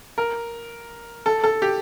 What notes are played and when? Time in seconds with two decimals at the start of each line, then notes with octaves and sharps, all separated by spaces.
0.18 A#4
1.26 A4
1.44 A4
1.62 G4